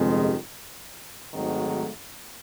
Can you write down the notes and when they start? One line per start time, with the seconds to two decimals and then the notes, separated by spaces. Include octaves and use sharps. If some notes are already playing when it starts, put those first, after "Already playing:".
Already playing: G1 F2 C3 D#3 G#3
1.33 G#1 G#2 D#3 F#3 A3